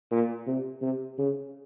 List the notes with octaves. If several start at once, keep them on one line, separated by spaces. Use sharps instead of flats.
A#2
C3
C3
C#3